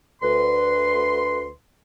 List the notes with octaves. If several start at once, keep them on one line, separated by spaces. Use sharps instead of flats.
D2 B4 C6